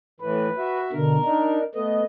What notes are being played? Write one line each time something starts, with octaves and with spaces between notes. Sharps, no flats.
A2 E3 B4
F#4 E5
B2 D3 A#4
D4 D#4
A3 B3 D#5